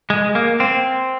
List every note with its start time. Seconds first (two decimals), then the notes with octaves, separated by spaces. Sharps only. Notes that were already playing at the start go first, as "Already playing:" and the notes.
0.10 G#3
0.35 A#3
0.60 C4